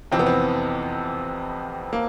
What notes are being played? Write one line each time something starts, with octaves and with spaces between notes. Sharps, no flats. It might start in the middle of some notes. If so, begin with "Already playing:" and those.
F2 C3 E3 C4
B3
C4
A#3